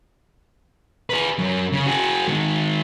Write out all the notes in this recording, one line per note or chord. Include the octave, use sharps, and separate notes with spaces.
G#4 B4
F#2
C#3
F#4 G#4
D#3 G#3